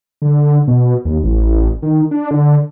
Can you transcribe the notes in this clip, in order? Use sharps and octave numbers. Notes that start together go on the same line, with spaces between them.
D3
B2
D#2
A1
D#3
D4
D3